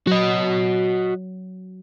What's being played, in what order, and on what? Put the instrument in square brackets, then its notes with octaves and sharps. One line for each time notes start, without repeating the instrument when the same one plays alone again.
[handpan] F#3 [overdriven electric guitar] F#4 D#5